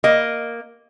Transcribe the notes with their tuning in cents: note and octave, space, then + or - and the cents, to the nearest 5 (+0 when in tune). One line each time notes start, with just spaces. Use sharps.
A#3 +0 D#5 +0